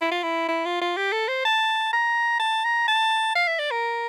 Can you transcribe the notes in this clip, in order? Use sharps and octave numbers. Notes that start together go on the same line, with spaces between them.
E4
F4
E4
E4
F4
F4
G4
A4
C5
A5
A#5
A5
A#5
A5
F5
E5
D5
A#4